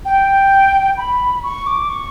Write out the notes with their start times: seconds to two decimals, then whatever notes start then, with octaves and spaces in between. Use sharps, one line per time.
0.05 G5
0.97 B5
1.43 C#6
1.67 D6
1.89 C#6